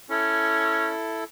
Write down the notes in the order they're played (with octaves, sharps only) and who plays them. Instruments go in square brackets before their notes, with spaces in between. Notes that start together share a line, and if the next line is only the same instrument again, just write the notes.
[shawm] C#4 [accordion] E4 A4